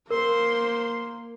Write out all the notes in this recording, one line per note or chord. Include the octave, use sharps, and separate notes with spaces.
A#3 A#4 C5 C6